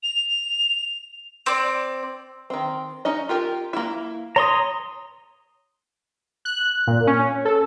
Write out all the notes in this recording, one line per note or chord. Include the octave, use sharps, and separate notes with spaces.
F7
C4 D5
D#3 C4
C#4 D#4 D#5
F4 G4 A#4
A#3 E4
C#5 A#5 C6 D#6
F#6
A#2
C#4
A4